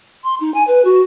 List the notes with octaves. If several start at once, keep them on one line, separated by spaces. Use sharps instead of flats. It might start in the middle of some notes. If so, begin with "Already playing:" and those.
C6
D#4
G#5
B4
F#4